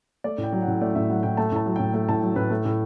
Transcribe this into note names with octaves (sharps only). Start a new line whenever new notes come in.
A3 D5
A2
G5
F#3
F#5
A2
A3 D5
A2 E5
F#3 F#5
A2 G5
A3 A5
A2 A5
F#3
A2 G5
A3 G5
A2 A5
F#3
A2 B4
A3
A2